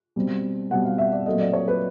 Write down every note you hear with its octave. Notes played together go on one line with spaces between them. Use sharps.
B2 G3 C4
B2 G3 C4 F#5
F5
E5
D5
A#2 F#3 A3 C4 D#5
D5
C#5
B4